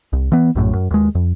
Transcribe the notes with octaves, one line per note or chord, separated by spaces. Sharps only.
C2
E3 B3
A#1 F#2 A2
F#2
D#2 G#3
F2